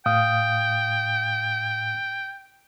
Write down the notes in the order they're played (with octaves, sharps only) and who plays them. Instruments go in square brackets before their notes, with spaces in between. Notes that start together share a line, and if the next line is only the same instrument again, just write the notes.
[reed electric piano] A2 F5 D#6 [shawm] G5